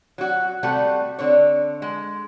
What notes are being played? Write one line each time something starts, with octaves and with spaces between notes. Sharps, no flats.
F#3 F#4
C3 G3 A3 F#4 F#5
D3 C4 C#5
G#3